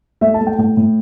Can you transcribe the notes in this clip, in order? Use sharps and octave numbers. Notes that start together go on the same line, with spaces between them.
A3 E5
A5
A3
G5
A2 G5
A2